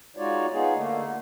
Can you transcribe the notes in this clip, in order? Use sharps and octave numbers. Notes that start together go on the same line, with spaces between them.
G#3 D#4 F4 F#4 C#5 D5
B3 D#4 F4 G#4
D3 A3 A#3